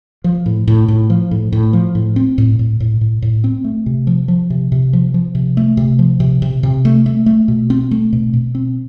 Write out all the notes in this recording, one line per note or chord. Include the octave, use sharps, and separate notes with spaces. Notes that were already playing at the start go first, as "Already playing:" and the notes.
F3
A2
A2
A2
F3
A2
A2
F3
A2
C4
A2
A2
A2
A2
A2
C4
A3
C3
F3
F3
C3
C3
F3
F3
C3
A3
C3
F3
C3
C3
C3
A3
A3
A3
B2
C4
A3
B2
B2
C4